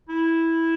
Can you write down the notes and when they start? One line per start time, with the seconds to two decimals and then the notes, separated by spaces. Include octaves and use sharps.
0.09 E4